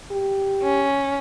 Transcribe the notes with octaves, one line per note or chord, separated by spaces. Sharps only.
G4
C#4